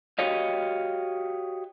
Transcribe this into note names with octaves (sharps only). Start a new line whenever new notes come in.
F#4 G4 C#5 D#5 F5